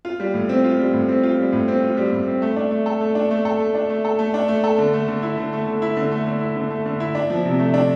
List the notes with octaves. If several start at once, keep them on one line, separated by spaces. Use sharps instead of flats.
F4
G3
A2
C4
F4
G3
A2
C4
F4
G3
A2
C4
F4
G3
A2
C4
A3
D4
A3
A4
A3
D4
A3
A4
A3
D4
A3
A4
A3
D4
A3
A4
D3
A3
D3
E4
D3
A3
D3
E4
D3
A3
D3
E4
D3
A3
D3
E4
D4
F3
C3
A3
D4